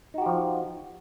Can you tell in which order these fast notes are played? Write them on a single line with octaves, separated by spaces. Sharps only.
D#4 F#4 G4 F3